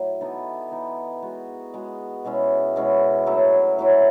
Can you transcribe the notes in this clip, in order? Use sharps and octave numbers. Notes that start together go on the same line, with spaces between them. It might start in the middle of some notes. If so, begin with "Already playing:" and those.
Already playing: A2 F#3
E3 B3 D#4 A4
E3 B3 D#4 A4
G#3 B3 F#4
G#3 B3 F#4
B2 G#3 C#4 E4
B2 G#3 C#4 E4
A2 F#3 C#4 E4
A2 F#3 C#4 E4